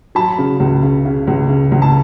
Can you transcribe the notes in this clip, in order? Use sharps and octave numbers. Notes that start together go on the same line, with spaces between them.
F#3 A5 B5
C#3
C#2
C#3
C#3
C#2
C#3
C#2
A5